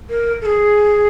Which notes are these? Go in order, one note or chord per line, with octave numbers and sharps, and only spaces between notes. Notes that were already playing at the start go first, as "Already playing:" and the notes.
A#4
A4
G#4